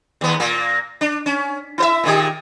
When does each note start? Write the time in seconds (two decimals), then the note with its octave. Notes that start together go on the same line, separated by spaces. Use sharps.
0.21 D#2 B3
0.40 A#2 A#3
1.01 D4
1.26 C#4
1.78 E4 C5 E5
2.04 A#2 D#3 G4